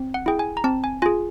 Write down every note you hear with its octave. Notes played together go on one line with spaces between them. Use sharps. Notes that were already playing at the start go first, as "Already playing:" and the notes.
Already playing: C4
F#5
E4 G#4 G5
G#5
A#5
C4 A5
G#5
F4 G#4 G#5